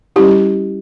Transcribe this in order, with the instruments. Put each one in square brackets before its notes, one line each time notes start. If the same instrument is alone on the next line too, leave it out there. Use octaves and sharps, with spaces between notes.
[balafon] G3 C#4 E4 G4